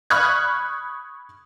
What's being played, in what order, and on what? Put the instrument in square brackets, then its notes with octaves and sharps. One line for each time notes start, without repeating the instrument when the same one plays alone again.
[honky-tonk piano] B5 C#6 D#6 F6 F#6 G#6